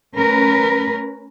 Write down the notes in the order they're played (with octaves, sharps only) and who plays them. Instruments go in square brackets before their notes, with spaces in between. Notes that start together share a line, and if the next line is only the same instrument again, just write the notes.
[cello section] A3 C#4 A#4 B4